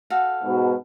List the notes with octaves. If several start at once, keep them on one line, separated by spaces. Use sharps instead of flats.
F#4 A4 F5
G#2 B2